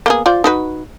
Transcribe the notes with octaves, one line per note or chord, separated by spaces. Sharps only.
A#3 B3 G#4
F4 C5 D5
D#4 F#4 B4